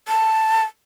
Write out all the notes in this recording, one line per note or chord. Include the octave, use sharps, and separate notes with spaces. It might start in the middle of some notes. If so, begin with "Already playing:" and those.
A5